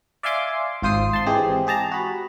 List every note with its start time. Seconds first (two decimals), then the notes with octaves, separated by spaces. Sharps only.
0.23 D5 E5 F5 G#5 C6 D6
0.82 G#1 F4 C5 D#6 C7
1.13 A5 C6
1.26 E3 G#3 C4 G4 G#4
1.67 G4 G#4 A5 A#5
1.91 F#4 B5